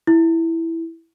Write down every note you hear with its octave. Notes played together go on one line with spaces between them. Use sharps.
E4